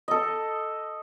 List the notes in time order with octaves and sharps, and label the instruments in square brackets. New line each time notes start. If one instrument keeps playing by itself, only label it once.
[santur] A4 D#5